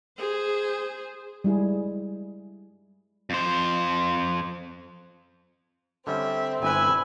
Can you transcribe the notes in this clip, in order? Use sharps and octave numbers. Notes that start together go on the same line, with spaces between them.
G#4 C5
G3 G#3 E4 G#4
F2 C5
D3 G3 C4 C#4 E5
G1 E4 B4 G#5 B5 E6